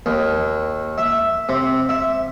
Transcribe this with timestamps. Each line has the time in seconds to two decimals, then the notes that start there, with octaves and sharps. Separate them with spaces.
0.06 D#2
0.98 E5
1.49 C3
1.89 E5